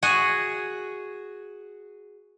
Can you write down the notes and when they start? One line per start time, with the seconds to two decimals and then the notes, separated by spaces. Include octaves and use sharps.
0.03 F#4 G#4